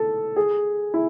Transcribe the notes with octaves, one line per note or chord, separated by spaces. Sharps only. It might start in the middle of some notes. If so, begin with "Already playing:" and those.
Already playing: A4
G#4
E4